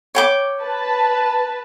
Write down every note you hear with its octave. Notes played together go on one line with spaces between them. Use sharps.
C#5 G5 D6
B4 A5